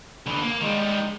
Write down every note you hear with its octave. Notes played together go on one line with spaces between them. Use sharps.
D2 E3
A#3
D#3 G3 G#3